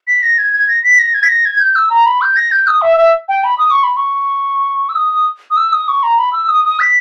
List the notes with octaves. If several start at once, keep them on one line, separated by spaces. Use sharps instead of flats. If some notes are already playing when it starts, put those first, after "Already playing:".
B6
A#6
G#6
G#6
A#6
B6
A#6
G#6
B6
A#6
G#6
G6
E6
A#5
B5
G6
A#6
G6
D#6
E5
E5
G5
B5
D#6
C#6
B5
C#6
E6
D#6
D#6
E6
D#6
C#6
A#5
B5
E6
D#6
D#6
B6